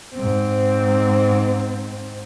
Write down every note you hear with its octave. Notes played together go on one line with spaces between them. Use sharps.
G#2 C4